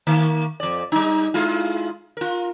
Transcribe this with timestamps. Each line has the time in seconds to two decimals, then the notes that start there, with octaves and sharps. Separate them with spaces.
0.07 D#3 A#3
0.60 F2 D5
0.92 G3 D#4
1.34 G#3 E4 F4
2.17 F4 A#4